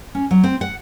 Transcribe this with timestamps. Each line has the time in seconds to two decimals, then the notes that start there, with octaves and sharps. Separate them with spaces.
0.15 C#4
0.31 F#3
0.44 C4
0.61 F#5